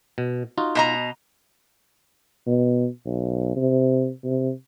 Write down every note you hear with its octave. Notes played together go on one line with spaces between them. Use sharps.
B2
D#4 F4 F#4
B2 D#5 A#5
B2
B1
C3
C3